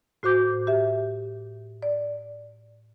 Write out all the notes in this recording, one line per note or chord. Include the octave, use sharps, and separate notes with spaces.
A2 F#4 C5 D6 G6
G4 E5
D5